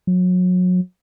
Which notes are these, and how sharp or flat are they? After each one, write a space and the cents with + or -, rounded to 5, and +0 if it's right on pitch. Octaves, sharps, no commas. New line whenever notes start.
F#3 -30